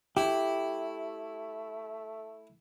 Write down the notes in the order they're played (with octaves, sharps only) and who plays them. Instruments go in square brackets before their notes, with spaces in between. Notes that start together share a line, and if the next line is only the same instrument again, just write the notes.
[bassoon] A3 [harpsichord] E4 [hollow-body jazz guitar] G4